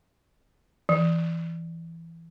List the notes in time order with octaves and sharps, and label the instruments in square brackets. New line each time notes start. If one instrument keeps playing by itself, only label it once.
[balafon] E3